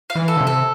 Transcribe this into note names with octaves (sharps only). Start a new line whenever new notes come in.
F5
E3
A4
D3
C3
A4